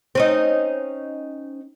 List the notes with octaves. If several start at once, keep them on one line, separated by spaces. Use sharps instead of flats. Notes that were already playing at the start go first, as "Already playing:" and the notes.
C4 C#4 D#4